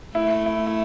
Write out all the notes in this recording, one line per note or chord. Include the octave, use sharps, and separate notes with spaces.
A3 E4
E4
E4